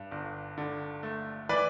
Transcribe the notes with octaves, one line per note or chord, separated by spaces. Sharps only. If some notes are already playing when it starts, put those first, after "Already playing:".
Already playing: G2
G1
D3
A3
E3 B4 D5